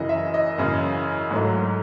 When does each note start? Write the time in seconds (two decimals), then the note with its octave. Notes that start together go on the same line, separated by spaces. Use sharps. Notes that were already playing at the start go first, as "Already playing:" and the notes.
Already playing: F#2 C#3 E3 D#5
0.09 E5
0.34 D#5
0.58 F#2 C#3 E3
1.31 G#2 F#3 A3